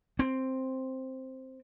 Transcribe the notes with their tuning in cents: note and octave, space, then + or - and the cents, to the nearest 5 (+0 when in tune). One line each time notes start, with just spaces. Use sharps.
C4 +5